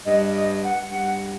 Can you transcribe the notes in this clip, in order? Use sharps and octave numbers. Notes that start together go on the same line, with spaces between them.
G2 D#5
D#5
F#5
G2 F#5